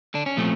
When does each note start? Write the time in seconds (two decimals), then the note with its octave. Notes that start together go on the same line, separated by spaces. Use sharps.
0.14 D3 D4
0.26 C#4
0.37 A#2 F3 A3 C4